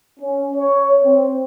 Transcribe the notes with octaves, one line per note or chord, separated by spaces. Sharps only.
C#4
C#5
C4